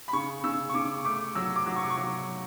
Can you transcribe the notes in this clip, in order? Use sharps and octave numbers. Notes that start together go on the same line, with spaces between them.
B5
C#3 C#6
C#3 E6
C#6
C#3 D6
A3 D6
F#3 E6
D6
F#3
C#6
D6
C#6
F#3